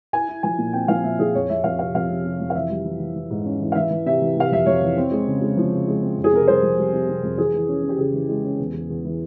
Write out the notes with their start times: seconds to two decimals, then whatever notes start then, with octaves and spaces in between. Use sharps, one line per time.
0.13 E4 G#5
0.28 E4
0.43 F3 G#5
0.59 A#2
0.73 C4 G5
0.88 F3 F5
1.04 A#2 E5
1.19 F3 G#4
1.35 F2 C#5
1.50 F2 E5
1.64 F2 F5
1.79 C3 F5
1.94 F2 F5
2.10 C3
2.25 C3
2.40 F2
2.50 F5
2.55 E3 E5
2.70 G3
2.85 E3
3.00 E3
3.16 E3
3.31 G#2
3.46 C#4
3.60 E3
3.72 F5
3.75 E3 E5
3.91 E3
4.06 C3 E5
4.22 E3
4.37 C3 F5
4.52 F2 E5
4.66 F2 C#5
4.82 E3
4.97 C4
5.11 G#3
5.27 C#3
5.41 G#3
5.57 F3
5.73 C#3
5.88 G#3
6.03 C4
6.17 F2
6.24 G#4
6.33 C3 A#4
6.48 G3 C5
6.63 F2
6.77 G3
6.93 C3
7.09 C3
7.23 F2
7.38 E3 G#4
7.54 E3
7.69 C#4
7.83 C#4
7.89 G4
7.98 C#3 G#4
8.14 E3
8.29 G#3
8.44 C#4
8.59 E2
8.74 E2
8.90 E2
9.05 E3